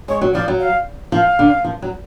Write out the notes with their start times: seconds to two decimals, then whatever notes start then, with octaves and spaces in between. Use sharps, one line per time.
0.08 G#3 C#5
0.21 F#3
0.34 F3 D5
0.48 F#3
0.60 F5
1.12 F3 F5
1.39 D3
1.65 F3
1.82 F#3